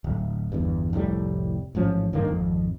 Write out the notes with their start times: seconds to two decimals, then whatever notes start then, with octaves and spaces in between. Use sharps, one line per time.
0.04 D1
0.52 G1 E2 G2
0.93 F1 C2 A2 G3
1.75 A1 G#2 F3 C#4
2.13 G2 D3 D#3 A#3
2.28 G#1 F2